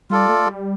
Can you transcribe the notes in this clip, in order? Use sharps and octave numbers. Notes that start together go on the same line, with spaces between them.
G3 F4 A4 D5
A3
A3
G3